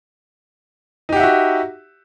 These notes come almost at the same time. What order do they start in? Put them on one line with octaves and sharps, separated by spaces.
D#4 G4 F#5 E5 F#4